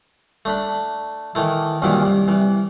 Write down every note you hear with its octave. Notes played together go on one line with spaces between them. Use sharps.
A3 D4 B5
D#3 E3 A3 E4
C2 F#2 A#2 D#3 E3 E4
C2
C2 E3